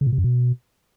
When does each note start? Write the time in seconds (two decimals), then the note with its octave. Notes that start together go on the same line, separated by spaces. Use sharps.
0.01 C#3
0.07 A#2
0.13 C3
0.18 F#2
0.24 B2